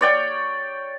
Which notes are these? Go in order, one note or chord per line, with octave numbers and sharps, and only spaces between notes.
C#5 D5 G5